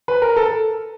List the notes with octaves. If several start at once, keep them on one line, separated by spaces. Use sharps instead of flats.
B4
A#4
A4